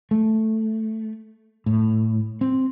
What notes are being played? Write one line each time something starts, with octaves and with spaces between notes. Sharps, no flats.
A3
A2
C4